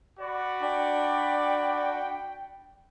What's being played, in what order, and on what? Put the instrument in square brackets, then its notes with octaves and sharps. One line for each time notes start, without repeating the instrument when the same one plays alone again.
[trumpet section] F#4 D5 B5
[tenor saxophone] D4 [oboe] G5